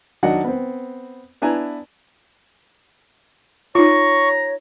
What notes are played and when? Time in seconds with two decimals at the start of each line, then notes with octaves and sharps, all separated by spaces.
0.23 D#3 F#3 D4 D#5 F#5
0.44 B3 C4
1.42 B3 D4 E4 B4 G#5 A#5
3.75 D#4 F4 C#5 A#5 C#6